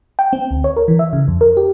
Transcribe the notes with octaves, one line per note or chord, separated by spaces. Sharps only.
G5
C4
D2
C#5
A#4
E3
E5
C#3
F2
A#4
G4